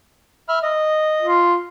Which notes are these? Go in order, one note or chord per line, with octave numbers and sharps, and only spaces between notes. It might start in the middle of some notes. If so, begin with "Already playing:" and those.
E5 B5 F6
D#5
F4